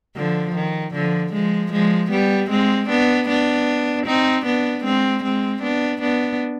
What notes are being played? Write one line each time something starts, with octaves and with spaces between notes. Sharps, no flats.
D3 F3
D#3
D3 F3
F3 G#3
F3 G#3
G3 B3
G#3 C4
B3 D4
B3 D4
C4 D#4
B3 D4
G#3 C4
G#3 C4
B3 D4
B3 D4